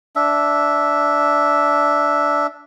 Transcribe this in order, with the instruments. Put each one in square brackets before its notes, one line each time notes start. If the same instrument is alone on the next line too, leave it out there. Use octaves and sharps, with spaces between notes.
[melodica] D4 E5